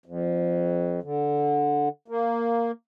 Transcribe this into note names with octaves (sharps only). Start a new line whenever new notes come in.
F2
D3
A#3